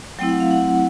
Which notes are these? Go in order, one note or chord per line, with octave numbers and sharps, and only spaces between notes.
F#3 A3 C4 E4 G5
F#5
F5
F#5